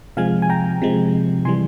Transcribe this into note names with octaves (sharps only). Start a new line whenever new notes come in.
C3 F3 G#3 F5 G#5
G#5
G5 A#5
C3 F3 G#3
C3 E3 G3 G#5 C6